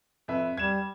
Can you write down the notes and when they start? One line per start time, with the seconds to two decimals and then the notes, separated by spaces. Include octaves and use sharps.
0.28 F2 B4 E5
0.57 G3 G#6 E7